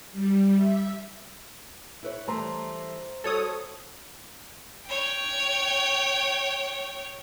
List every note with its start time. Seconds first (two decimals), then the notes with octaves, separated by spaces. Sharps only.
0.12 G3
0.56 E5
2.03 E4 B4 C#5
2.28 E3 G3 A3 C5 A#5 C6
3.24 G3 F#4 A4 C#5 D#6
4.87 C#5 G5